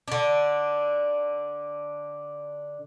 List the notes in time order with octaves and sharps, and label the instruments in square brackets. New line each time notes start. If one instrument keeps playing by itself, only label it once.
[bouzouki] D3 D4